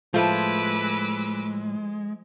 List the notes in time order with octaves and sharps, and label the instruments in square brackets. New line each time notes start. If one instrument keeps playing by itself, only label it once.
[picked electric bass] A2 [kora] F3 A3 [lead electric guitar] G#3 [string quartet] B4 D6 E6